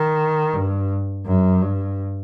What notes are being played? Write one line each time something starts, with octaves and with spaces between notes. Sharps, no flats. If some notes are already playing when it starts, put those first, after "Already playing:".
Already playing: D#3
G2
F#2
G2